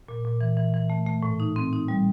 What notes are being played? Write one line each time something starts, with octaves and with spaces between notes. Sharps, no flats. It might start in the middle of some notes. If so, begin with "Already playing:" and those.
A#2
A#2
E3
E3
E3
A3
A3
A2
D#4
C4
D#4
G3